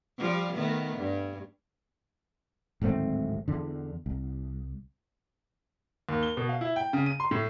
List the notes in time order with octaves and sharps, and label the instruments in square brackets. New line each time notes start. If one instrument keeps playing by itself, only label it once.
[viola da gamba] F3 G3 F4
D#3 A3 B3
G2
[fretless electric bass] D1 G#1 A3 C4
E2 D3
C2
[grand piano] D#2
G7
B2
F5
E4
G5
C#3
D#7
C6
A2